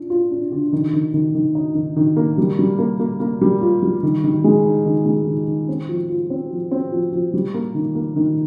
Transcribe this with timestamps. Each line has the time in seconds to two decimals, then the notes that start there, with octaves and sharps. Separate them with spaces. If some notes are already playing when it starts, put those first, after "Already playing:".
Already playing: D4 F4
0.10 F4
0.31 D4
0.52 D3
0.73 D#3
0.93 D#3
1.14 D#3
1.35 D#3
1.55 D#4
1.75 D#3
1.96 D#3
2.17 A#3
2.38 G3
2.59 G3
2.79 A#3
3.00 A#3
3.20 A#3
3.41 G3
3.61 F4
3.83 G3
4.03 D#3
4.24 D#3
4.44 G#3
4.65 D#4
4.86 D#3
5.06 G#3
5.27 D#3
5.47 D#3
5.69 C4
5.89 F3
6.10 F4
6.30 C4
6.50 F3
6.71 C4
6.92 F3
7.12 F3
7.34 G3
7.54 A#3
7.75 D#3
7.95 A#3
8.16 D#3